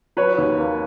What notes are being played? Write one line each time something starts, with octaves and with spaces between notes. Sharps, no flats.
F#3 B4 C#5
D#2
A#3